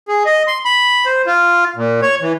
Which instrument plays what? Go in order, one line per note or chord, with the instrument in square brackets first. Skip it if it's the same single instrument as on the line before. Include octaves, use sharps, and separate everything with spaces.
[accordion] G#4
D#5
C6
B5
C5
F4
A#2
C#5
E3